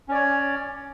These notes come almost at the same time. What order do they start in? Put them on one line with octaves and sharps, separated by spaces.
C#4 D5 C#5